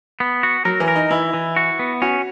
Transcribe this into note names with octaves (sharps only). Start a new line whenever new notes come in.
B3
F#4
F#3 A#4
E3
A#4
D#4
E3 E4
E3
F#4
B3
C#4 F#4